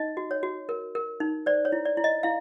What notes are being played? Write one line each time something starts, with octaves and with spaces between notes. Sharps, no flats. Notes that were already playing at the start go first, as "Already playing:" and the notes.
Already playing: D#4 D#5
F#4
C#5
F#4
A#4
A#4
D#4
C5 D5
C#5
E4
D5
E4
D#5
E4 F5